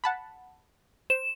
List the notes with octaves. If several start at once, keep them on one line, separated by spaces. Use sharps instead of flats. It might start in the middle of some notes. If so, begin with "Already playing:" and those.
F#5 A5 B5
C5 E7